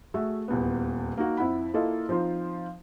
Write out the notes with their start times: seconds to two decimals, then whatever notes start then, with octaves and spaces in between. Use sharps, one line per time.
0.14 A3 F#4 G#4 E5
0.48 D#1 E2 B3
1.18 A#3 D#4 F#4
1.37 F2 E4 F#5 B5
1.74 A#3 E4 F4 A4 D#5
2.09 F3 C4 D#4 F4 C5